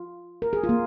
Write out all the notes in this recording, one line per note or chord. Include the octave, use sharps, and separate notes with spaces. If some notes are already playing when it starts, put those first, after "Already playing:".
Already playing: F4
A#4
G#4
F4
A#3